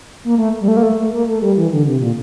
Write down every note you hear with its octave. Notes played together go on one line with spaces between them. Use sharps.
A#3
A3
G3
A3
A#3
A3
A3
A#3
A3
G3
E3
D3
C3
A#2